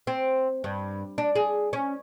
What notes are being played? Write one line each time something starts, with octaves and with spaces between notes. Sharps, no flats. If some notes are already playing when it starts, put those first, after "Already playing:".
C4
G2
D4
G#4
C#4